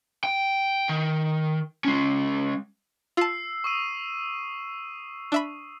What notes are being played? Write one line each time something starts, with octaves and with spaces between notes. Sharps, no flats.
G5
D#3
G#3 C#4
F4 A5 E6 C7
C#6 D#6 D#7
D4 E5 B5